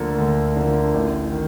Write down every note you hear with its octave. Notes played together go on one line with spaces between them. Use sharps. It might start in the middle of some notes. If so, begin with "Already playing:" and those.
Already playing: D2 D3 F3 A#3 A4
D2
D3 F3 A#3
A1
D#3